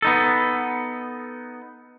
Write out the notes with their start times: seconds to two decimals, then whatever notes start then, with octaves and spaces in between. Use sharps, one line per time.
0.02 B3 D#4 A4